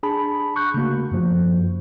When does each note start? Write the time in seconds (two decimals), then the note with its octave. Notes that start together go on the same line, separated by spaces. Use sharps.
0.03 D4 G#4 A5 B5
0.56 C#6 F#6 G6
0.74 C#3 A3 A#3 F#4
1.11 F#2 F3